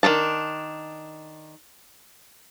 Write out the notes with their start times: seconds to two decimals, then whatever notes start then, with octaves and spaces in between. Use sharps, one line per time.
0.03 D#3 D4 A4 A5